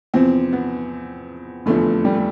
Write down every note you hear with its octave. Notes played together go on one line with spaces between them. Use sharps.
E2 C3 F3 C4
B3
F1 E2 D3 F3 A3
G3
A3